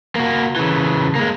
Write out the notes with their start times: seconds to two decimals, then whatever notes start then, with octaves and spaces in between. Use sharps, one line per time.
0.15 A#3 F#4
0.56 C#3 E3
1.15 G#3 A#3